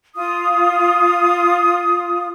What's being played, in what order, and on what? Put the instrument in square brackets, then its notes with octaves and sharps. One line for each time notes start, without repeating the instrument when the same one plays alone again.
[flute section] F4 D#6